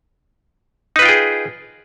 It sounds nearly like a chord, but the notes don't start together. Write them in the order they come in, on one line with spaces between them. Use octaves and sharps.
D#4 B4 F4 G5 G#4